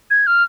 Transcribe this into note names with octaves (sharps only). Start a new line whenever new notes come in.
G#6
F6